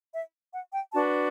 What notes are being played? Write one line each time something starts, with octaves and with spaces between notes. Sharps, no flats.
E5
F#5
G5
D4 F#4 B4 A5